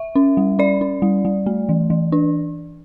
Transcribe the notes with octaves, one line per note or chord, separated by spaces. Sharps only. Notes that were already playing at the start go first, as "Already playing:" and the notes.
Already playing: E5
C#4
G3
C#4 D5
C#4
G3
G3
A3
E3
E3
D4